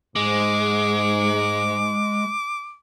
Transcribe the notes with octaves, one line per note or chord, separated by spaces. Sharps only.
G#2 G#3 D6